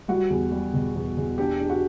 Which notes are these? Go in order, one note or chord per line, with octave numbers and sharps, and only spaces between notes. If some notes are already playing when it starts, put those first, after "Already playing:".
G3 F#4
E2
G3
B2
E2
E2
D4 G4
D4
F#4